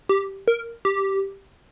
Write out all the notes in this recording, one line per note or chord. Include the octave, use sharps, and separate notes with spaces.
G4
A#4
G4